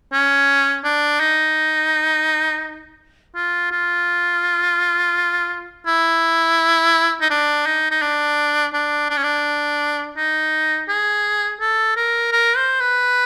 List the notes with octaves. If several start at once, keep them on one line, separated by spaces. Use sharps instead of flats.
C#4
D4
D#4
F4
F4
E4
D#4
D4
D#4
D#4
D4
D4
D4
C#4
D4
D#4
G#4
A4
A#4
A#4
C5
B4